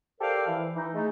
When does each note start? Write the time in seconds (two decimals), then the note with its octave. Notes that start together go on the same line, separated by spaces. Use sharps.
0.21 G4 A4 A#4 C5 D5 F5
0.48 E3
0.75 E3 D#4
0.93 G#3 A3 D#4